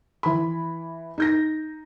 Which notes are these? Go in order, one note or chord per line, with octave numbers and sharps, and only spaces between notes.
E3 B5
D#4 G6 A#6